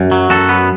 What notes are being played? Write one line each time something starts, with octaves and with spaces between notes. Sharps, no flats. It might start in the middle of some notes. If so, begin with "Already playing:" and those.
Already playing: F#2
F#3
F#2 F#4 A4
B3